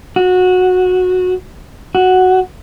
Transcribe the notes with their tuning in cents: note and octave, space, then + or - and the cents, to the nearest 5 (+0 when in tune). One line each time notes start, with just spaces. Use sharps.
F#4 -15
F#4 +0